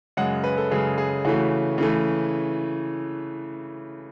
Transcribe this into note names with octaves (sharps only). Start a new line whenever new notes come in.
F#2 C#3 G#3 F#5
B4
A4
F#2 C#3 G#3 G#4
G#4
C#3 E3 A3 F#4
C#3 E3 A3